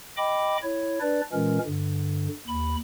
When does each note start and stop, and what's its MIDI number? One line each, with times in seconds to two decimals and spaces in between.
0.17 0.57 75
0.17 0.57 79
0.17 0.57 83
0.17 0.57 86
0.63 0.99 64
0.63 0.99 73
1.01 1.21 62
1.01 1.21 71
1.01 1.21 74
1.33 1.58 46
1.33 1.58 52
1.33 1.58 56
1.33 1.58 61
1.33 1.58 70
1.66 2.28 43
1.66 2.28 50
2.48 2.76 39
2.48 2.76 83